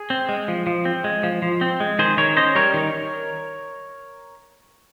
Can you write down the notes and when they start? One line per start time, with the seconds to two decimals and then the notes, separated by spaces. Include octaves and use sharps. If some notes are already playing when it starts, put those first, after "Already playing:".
Already playing: G#4
0.10 C4
0.29 G#3
0.48 F3
0.67 F3
0.85 C4
1.04 G#3
1.23 F3
1.42 F3
1.61 C4
1.80 G#3
1.99 D#3 G#4 C5
2.17 D#3 A#4 C#5
2.36 C#4 C5 D#5
2.55 G3 A#4 C#5
2.74 D#3